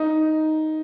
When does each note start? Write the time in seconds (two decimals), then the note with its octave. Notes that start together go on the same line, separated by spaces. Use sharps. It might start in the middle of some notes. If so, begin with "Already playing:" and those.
Already playing: D#4